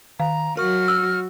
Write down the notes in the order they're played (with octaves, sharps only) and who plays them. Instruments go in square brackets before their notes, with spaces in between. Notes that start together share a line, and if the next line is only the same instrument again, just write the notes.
[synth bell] D#3 [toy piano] F5 [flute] A#5
[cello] F#3 F#4 [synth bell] A#4 C#6 [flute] F6
[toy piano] E6 [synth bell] F#6